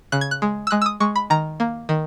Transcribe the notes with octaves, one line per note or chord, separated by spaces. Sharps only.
C#3 F#6
G#6
F#6
G#3
E6
G#3 F#6
E6
D#6
G#3 C#6
B5
D#3 A#5
A#3
D#3